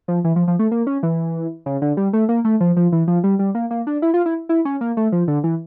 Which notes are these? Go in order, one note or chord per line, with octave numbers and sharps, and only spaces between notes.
F3
E3
F3
F3
A3
A#3
C#4
E3
C#3
D3
G3
A3
A#3
A3
F3
F3
E3
F3
G3
G3
A#3
A#3
D4
E4
F4
E4
E4
C#4
A#3
A3
F3
D3
E3